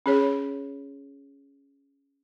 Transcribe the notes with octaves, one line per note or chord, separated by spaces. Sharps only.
C#4 G#4 C#5